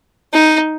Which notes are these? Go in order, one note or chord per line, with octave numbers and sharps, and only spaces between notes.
D#4